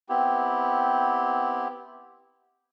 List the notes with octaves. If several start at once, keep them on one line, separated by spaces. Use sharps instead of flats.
B3 C4 E4 G4